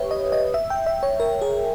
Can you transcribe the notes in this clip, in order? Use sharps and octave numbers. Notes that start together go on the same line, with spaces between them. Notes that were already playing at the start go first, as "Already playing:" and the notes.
Already playing: G4 B4 C#5 E5
D#5
D#5
E5
G5
E5
C#5
A#4
G#4